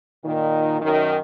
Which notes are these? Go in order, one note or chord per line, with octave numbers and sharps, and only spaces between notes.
A#2 D#3
F#2 D#3